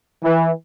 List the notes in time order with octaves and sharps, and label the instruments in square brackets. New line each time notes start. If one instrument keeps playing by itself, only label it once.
[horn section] E3